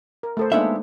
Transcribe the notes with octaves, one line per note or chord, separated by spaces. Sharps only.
A#4
A3 A4 C5
G#3 A#3 B3 D4 D#4 E5